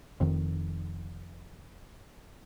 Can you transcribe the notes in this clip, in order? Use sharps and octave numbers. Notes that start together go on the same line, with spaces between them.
F1 F2 D#3